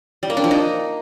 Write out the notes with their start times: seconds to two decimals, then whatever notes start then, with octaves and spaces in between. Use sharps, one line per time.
0.23 G3
0.30 A#3
0.37 D4
0.44 F3
0.51 D#4